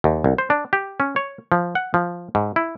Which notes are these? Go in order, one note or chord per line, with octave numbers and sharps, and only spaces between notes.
D#2
C2
C5
D4
G4
C#4
C#5
F3
F#5
F3
G#2
E4